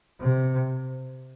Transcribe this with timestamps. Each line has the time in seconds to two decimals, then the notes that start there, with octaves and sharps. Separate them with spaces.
0.20 C3